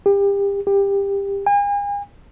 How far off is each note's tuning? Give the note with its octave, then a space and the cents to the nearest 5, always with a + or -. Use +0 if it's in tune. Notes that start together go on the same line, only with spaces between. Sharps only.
G4 +30
G4 +20
G#5 -40